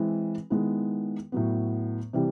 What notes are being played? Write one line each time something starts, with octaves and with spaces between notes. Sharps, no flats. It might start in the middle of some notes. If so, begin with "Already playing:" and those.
Already playing: E3 G#3 C4 E4
D#3 G#3 B3 E4
A2 F#3 B3
C3 E3 G3